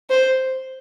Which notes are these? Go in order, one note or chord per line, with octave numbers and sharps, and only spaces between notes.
C5